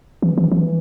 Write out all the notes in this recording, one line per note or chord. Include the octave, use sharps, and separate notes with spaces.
E3
E3
E3